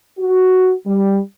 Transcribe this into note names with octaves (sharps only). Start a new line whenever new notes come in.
F#4
G3